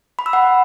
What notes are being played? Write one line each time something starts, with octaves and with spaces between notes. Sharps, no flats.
B5
E6
F#5